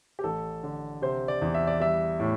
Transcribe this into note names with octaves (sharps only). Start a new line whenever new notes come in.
G4
A1 A4
D3
C3 C5
D5
E2
E5
D5
G3 E5
A2